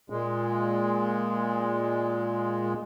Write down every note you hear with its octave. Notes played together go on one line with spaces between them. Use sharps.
A#2 G#3